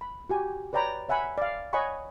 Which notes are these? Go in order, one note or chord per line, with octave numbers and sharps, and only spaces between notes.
B5
F#4 G4 G#5
B4 C#5 D5 G5 A#5 B5
C#5 E5 F#5 G#5 B5
D5 F5
C#5 D#5 F#5 G#5 B5 C#6